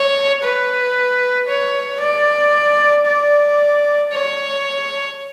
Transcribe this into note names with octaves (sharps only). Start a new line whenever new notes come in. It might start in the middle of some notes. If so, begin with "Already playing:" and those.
Already playing: C#5
B4
C#5
D5
D5
C#5